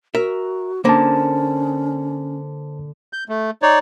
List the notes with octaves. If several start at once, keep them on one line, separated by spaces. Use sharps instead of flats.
F#4 A#4 E5
D3 A#3 C#4 C5 A5
G6
A3
D#4 C#5 D5